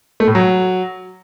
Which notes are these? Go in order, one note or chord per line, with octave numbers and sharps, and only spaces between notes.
A3
A2
F#3